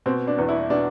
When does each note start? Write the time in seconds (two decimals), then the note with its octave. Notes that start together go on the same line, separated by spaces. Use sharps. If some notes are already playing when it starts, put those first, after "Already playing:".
0.06 B2 C4
0.27 D4
0.38 E2
0.49 E4
0.70 B2 D4